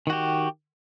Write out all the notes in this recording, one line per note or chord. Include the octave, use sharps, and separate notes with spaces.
D#3 F#4 G4